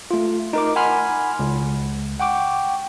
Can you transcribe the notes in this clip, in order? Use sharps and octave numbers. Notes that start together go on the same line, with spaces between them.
A3 F4
D#4 A#4 D6
F#5 G#5 B5 C6 F6
C#2
F#5 G5 C#6 D6